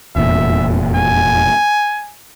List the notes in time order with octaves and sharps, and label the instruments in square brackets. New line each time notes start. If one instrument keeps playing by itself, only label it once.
[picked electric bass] F1 E2 A#2 [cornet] E5
[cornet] G#5